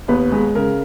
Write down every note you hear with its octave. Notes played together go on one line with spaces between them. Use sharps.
D#2 B3 B4
G#3
C#3 A#4